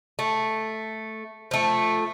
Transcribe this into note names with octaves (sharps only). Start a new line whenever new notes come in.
A3
F3 A3